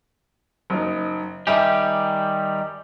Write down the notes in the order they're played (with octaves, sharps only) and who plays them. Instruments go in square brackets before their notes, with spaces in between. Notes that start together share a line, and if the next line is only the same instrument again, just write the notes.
[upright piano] F#1 D#4
[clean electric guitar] D#3 G3 G4 [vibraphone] D#5 [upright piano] E5 G#5